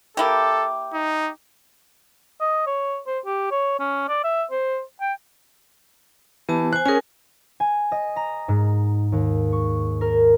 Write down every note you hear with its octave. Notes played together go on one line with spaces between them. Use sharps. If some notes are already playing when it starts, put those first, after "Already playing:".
A#3 E4 G4 A4
D#4
D#5
C#5
C5
G4
C#5
C#4
D5
E5
C5
G5
E3 B3 G4 A5
C5 G#5 F#6
C#4 G#4 A#4 G#5
G#5
D#5
A#5
G#2
D#2
C#6
A#4